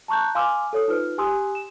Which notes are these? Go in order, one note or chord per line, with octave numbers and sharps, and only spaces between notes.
A5 A#5 C#6 F#6 G6
F5 G#5 C6 D6 E6 F6
A4 C#5 D#6
D#4 F4 B4 C5 F6
G4 G#5 C6 D#6 E6 F#6
E7